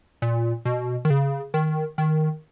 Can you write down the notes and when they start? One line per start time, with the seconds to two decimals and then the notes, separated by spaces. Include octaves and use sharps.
0.22 A#2
0.65 B2
1.05 D#3
1.10 C#3
1.54 D#3
1.98 D#3